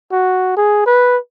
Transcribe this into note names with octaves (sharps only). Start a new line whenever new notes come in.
F#4
G#4
B4